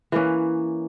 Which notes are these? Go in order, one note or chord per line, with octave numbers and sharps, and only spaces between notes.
E3 A#3 C#4 B4